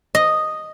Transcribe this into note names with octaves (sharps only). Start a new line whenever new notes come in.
D#5